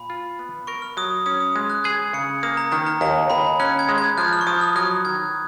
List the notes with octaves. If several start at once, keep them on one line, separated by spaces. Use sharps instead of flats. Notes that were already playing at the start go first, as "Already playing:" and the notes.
Already playing: A#2 B5
F4
B3
A#4 C#6
F6
F#3 D#6
C#4 D#6
D#6
G#3
F#6
G#4 G#6
C#3 C#7
A#3 D#6
A#5
D#3 A#5
A#5
D#2 A#5
D#2 B5
C#4 F#6
G#6
G#3
G#6
F3 F#6
F6
C#6
F3 D#6
F6
F#3 F#6
D#3 G#6